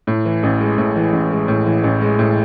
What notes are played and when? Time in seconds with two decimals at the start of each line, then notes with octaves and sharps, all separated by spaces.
0.07 A2
0.25 E3
0.43 A1
0.61 G#3
0.78 A2
0.96 E3
1.12 A1
1.30 G#3
1.48 A2
1.66 E3
1.84 A1
2.01 G#3
2.19 A2